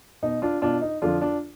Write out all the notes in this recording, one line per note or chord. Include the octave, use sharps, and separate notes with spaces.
B2 D#4
D4 F4
B2 D4 F4
D#4
F2 D3 F3 D4 F4
D4 F4